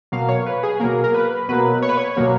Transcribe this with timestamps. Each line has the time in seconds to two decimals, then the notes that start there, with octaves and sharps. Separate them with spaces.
0.12 B2 F#3 A#3 F5
0.29 C#5
0.46 B4
0.63 G#4
0.80 B2 F#3 A#3 A#4
1.04 A#4
1.14 B4
1.49 B2 F#3 A#3 B4
1.82 C#5
1.89 B4
1.97 C#5
2.17 B2 F#3 A#3